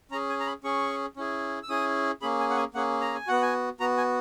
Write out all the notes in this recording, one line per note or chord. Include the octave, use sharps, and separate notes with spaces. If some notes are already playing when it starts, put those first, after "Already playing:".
C#4 G#4 A#5
G#5
A#5
B5
C#4 G#4 C#6
C#4 E4 G#4
E6
C#4 E4 G#4 D#6
A#3 C#4 G#4 B5
G#5
F#5
G#5
A#3 C#4 G#4 F#5
A#5
G#5
B3 F#4 F#5
G#5
B3 F#4 A#5
G#5